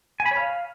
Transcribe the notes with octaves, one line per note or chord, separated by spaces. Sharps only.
G#5
B5
C#5
F5